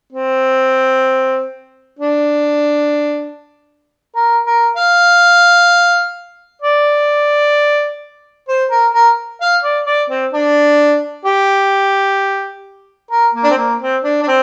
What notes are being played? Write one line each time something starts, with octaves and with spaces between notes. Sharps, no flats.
C4
D4
A#4
A#4
F5
D5
C5
A#4
A#4
F5
D5
D5
C4
D4
G4
A#4
A#3
D4
C4
A#3
C4
D4
D4
C4